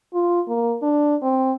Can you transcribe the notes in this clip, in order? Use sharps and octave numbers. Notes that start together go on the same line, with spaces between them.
F4
A#3
D4
C4